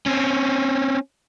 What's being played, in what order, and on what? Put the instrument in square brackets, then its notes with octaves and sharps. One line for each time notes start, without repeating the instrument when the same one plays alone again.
[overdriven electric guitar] C4 C#4